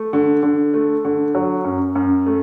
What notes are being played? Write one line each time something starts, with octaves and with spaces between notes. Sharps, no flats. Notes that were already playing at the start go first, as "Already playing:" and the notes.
Already playing: A3
D3
D3
A3
D3
F#3
F#2
F#2
A3